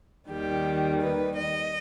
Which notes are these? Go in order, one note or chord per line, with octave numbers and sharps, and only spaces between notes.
D#2 D#3 G3 G4
B4
D#5